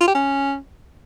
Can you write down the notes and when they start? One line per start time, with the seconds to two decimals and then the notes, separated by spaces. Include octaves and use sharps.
0.01 F4
0.08 G4
0.15 C#4